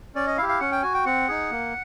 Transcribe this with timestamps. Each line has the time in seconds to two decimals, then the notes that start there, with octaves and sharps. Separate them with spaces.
0.15 C#4 D5
0.27 D#5
0.38 E4 F5
0.42 G4
0.49 F5
0.60 C#4 F#5
0.72 G5
0.83 F#4 G#5
0.94 G5
1.05 C4 F#5
1.28 D#4 G#4
1.51 A#3